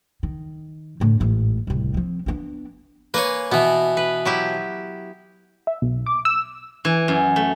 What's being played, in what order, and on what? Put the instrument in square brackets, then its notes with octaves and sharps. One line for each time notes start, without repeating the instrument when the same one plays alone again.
[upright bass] D#3
A2 D3
A1 G#2
D1 C2
F3 C4
B3 D4
[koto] A#3 G#5 [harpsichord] B4 C#5
[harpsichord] B2 E3 [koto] B3
[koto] B4
F#3 E4 G4
[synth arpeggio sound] E5
B1
D6
E6
[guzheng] E3
F#2
A3